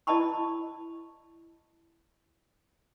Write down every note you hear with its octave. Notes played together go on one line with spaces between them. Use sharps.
E4 D5 D#5 A5 B5 C#6